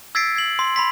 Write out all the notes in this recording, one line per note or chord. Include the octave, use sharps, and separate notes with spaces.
E6 G#6 A6 B6 C7 D7
G#6 C7 F#7
C6
B5 C6 B6